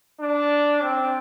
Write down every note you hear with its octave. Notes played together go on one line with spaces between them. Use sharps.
D4
C4